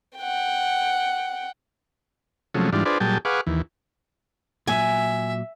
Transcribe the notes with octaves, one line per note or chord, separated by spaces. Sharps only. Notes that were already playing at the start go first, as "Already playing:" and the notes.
F#5 G5
C3 F3 F#3 G#3 A3 C#4
G#2 E3 G3 D4 F4
D4 F4 G#4 B4 C5 D5
A#2 F#3 G3 G#4 G5 A5
G#4 B4 F5 F#5 C#6 D6
D#2 E3
A#2 F#3 E5 G#5